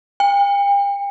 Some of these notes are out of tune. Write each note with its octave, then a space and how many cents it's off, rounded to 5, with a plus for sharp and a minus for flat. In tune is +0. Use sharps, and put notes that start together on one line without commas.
G5 +40